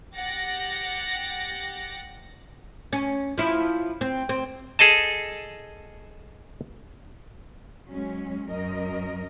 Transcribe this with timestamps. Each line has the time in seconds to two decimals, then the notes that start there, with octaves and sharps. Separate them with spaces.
0.15 G4 F#5 A6 A#6
2.93 C#4
3.38 F3 E4
4.01 C4
4.29 C4
4.79 G#4 A4 D#5 A5
7.88 F#3 G#3 C#4
8.49 F#2 A#4 D#5